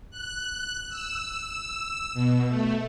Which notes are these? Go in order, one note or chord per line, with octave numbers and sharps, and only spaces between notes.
F#6
E6
B2
A3